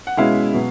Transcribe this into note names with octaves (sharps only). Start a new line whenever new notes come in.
F#5
B2 G#3 C#4 E4 F5
B2 F#3